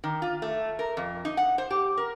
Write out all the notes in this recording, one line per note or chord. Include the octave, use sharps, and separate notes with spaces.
D#3
F4
A3
A#4
F2
D#4
F#5
C5
G4
A#4